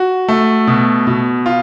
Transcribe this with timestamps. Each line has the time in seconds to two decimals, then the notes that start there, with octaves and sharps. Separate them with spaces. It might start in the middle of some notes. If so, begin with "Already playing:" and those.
Already playing: F#4
0.28 A3
0.67 B2
1.07 B2
1.46 F4